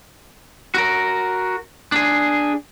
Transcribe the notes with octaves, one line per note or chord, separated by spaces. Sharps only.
F#4 A#4
D4 G#4